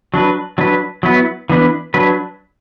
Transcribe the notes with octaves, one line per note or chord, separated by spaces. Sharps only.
F#3 D4 B4
F#3 D4 B4
F#3 B3 E4 B4
E3 B3 D4 B4
F#3 D4 B4